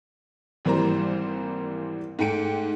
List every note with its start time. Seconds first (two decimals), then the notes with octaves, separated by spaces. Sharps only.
0.65 G#1 E3 G3 A#3 C5 A#5
2.19 G#2 A3 G5 C#7 D7